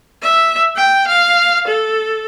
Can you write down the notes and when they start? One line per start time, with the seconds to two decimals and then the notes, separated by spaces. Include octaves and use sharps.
0.22 E5
0.76 G5
1.07 F5
1.67 A4